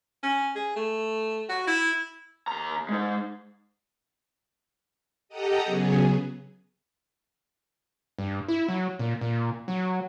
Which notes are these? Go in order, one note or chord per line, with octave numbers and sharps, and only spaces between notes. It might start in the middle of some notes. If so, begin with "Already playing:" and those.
C#4
G#4
A3
F#4
E4
D#2 A#5
G#3 D#4
G4 A4 D#5 F#5 A#5 D#6
C#3 F#3 B3 G#4
G2
E4
F#3
A#2
A#2
F#3